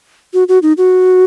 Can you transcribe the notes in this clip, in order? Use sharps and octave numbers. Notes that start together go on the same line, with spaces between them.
F#4
F#4
D#4
F#4